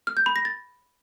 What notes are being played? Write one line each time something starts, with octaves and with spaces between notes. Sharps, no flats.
F6
G6
B5
A#6
A6